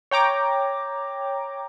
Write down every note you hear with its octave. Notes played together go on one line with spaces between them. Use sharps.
C#5 G5 A#5 D6